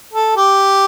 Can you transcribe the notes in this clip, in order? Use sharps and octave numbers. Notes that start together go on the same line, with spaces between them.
A4
G4